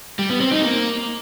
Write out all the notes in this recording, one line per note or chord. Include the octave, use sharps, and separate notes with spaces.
G3
B3
C4
D#4
A#3